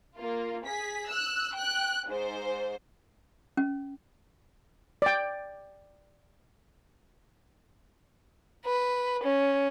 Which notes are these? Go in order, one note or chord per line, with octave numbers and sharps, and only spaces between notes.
A#3 F4
G#4 B6
E6 F#6
G5 F#6
G#2 C5
C#4
D5 G5
B4
C#4